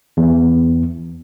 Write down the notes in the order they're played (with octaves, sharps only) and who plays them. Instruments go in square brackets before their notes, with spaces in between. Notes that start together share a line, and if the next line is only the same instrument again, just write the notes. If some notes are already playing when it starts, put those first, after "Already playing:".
[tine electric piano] E2